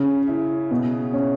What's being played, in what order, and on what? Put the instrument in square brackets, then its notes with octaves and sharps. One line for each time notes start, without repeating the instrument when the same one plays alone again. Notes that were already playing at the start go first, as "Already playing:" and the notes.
Already playing: [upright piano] C#3 C#4
E4
B2
C#4